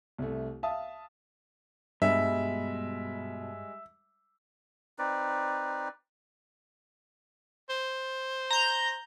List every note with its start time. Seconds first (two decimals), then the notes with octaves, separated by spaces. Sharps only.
0.18 C2 A3
0.63 E5 F5 A5 D#6
2.02 G2 B2 G3 G#3 E5
4.99 C4 D#4 B4 D5
7.70 C5
8.51 A#5 G6